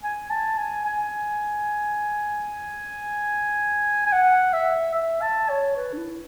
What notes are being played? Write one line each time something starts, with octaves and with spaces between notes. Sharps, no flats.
G#5
A5
G#5
G#5
G#5
F#5
E5
E5
A5
C#5
B4
D4
E4